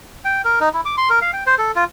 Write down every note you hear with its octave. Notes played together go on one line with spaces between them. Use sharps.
G5
A#4
D#4
E4
D6
C6
A#4
F5
G5
C5
A4
F4